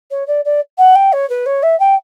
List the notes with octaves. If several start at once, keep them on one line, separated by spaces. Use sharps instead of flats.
C#5
D5
D5
F#5
G5
C#5
B4
C#5
E5
G5